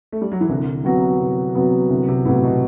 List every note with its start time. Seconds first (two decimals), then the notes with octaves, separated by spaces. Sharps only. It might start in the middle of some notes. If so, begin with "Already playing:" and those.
0.12 A3
0.21 G3
0.32 F#3
0.41 E3
0.49 C2 D3
0.84 C3 F#3 B3 F#4
1.20 C2
1.55 C3 F#3 B3 F#4
1.90 C2 D3
2.08 C3
2.25 A2 C3 F#3 B3 F#4
2.44 B2